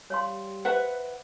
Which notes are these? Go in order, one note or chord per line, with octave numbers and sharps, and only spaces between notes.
G3 C#5 F5 C6
B4 C5 E5 F#5